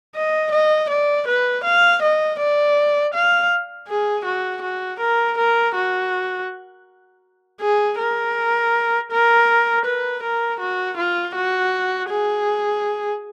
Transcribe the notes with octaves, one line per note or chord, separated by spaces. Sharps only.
D#5
D#5
D5
B4
F5
D#5
D5
F5
G#4
F#4
F#4
A#4
A#4
F#4
G#4
A#4
A#4
B4
A#4
F#4
F4
F#4
G#4